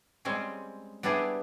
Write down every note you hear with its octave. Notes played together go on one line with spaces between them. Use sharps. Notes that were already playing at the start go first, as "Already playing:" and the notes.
G3 G#3 C4 C#4 G#4
G3 B3 D4 E4 G4 G#4